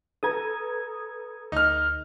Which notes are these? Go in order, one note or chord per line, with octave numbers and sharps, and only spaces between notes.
A4 B4 A#5 D#6 G#6
D2 D#4 F6